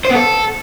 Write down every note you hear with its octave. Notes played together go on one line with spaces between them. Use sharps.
C5
B3
A4